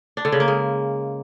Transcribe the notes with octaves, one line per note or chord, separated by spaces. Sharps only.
D4
D3
C#3
A#3
G#3